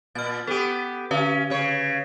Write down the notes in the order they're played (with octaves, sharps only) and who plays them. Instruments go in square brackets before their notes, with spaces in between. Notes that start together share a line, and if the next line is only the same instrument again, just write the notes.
[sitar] A#2 [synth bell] F6 A6
[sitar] B3 G4 [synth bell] A4
[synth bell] D3 B4 F5 [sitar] C#4
[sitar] C#3 C#5